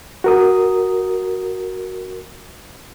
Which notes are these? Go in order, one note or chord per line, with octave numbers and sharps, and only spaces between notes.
F#4 A#4 D#6